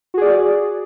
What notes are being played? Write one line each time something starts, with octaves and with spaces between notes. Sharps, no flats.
F#4 G#4 D5